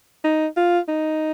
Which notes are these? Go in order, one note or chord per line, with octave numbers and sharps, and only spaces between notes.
D#4
F4
D#4